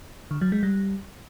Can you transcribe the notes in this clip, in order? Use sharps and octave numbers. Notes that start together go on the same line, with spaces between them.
D3
F#3
G#3
G3